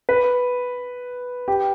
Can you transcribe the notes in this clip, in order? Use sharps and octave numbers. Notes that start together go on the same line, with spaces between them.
B4
G4